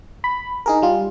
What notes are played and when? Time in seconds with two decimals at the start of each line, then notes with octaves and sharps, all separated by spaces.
0.24 B5
0.66 D#4 G#4 A#4
0.82 G3 F4